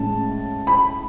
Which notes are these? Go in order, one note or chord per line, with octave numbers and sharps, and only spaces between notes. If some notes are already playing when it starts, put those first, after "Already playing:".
Already playing: A2 G#3 C#4 A5
B5